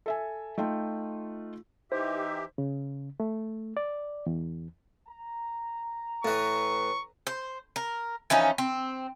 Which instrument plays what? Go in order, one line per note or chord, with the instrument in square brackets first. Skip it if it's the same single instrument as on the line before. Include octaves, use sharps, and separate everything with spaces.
[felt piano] A4 E5 G#5
A3 D#4 F4 G5
[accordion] E3 G4 [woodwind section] D#4 E5 [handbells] C5
[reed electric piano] C#3
A3
D5
E2
[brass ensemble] A#5
[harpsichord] A2 E3 [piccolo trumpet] C#6
[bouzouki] C5
A#4
E3 F3 C#4 D#4
C4